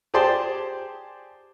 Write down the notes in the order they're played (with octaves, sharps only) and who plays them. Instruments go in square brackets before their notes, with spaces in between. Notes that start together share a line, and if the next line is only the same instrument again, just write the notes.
[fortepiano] G4 G#4 C5 D5 A5 C6